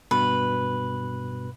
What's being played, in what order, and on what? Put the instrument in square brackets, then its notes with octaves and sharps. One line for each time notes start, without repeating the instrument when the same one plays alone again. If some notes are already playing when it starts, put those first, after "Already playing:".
[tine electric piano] G2 B2 [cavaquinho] B4